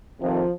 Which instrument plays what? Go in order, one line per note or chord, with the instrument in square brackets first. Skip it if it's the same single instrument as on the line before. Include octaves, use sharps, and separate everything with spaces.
[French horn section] F2 C3 D#3 F3